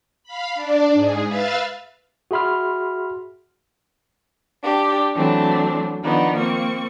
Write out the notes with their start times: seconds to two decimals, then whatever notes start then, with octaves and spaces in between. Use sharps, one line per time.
0.24 F5 B5
0.55 D4 D5
0.94 G#2 G#4
1.27 B4 E5 F5 A6
2.31 F#4 G#4 E5 B5 C6 F6
4.64 D4 G4
5.15 E3 F#3 A3 C4 D4
6.02 D#3 F3 B3 D4 D#4
6.37 A#3 C4 C#6